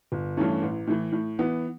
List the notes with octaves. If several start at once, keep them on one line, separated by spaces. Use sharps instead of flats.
G1
G2 E3 A3 C#4
A1
A2 E3
A2
E3 B3